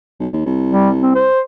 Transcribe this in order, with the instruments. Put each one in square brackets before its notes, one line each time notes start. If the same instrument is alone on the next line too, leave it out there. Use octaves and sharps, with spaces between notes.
[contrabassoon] B1
D#2
C2
[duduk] G3
C4
C5